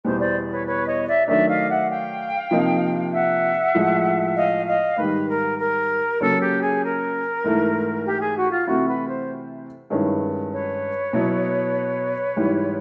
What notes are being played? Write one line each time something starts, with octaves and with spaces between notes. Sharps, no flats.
E2 B2 G3 B3 C5
C5 D5
B4 C#5
B4 C#5
C#5 D#5
D5 E5
D#3 F#3 A3 D4 D5 E5
D#5 F5
E5 F#5
F5 G5
C3 F3 A#3 D#4
E5 F#5
A2 F3 G#3
D#5 F5
D#5 F5
G#2 D#3 G3 B4
A#4
A#4
C#3 F#3 A#3 A4
G4
G#4
A#4
G#2 E3 A3
G4
G#4
F#4
F4
C3 E3 A3 C4 E4 F#4
B4
C5
G2 D#3 G#3 C#4 E4
B4 C#5
B2 F#3 B3 E4
G#2 E3 G3